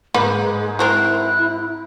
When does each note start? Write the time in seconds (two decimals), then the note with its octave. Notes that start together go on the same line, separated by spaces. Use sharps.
0.14 G#2 G#3 A#3 B4
0.79 F#3 C4 E4 A#4 F#6